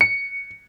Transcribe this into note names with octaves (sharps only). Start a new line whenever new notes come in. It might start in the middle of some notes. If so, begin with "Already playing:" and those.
C#7